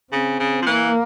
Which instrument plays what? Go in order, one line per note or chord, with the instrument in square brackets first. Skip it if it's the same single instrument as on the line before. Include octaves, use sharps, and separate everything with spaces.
[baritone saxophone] C#3 [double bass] C4
[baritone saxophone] C#3
F3
[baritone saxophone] E3 [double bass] A#3